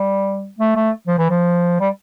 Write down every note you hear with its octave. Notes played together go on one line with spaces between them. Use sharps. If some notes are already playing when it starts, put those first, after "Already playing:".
Already playing: G3
A3
A3
F3
E3
F3
G3